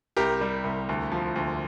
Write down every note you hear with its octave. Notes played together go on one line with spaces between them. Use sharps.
C2 G4 A#4
G3
C2
D2
F3
D2